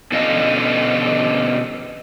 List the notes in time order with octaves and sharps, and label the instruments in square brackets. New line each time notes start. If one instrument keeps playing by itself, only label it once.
[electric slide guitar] B2 D3 C#4 D#5 F5 A5